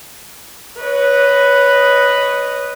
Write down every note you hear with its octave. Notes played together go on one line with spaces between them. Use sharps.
B4 C#5 D#5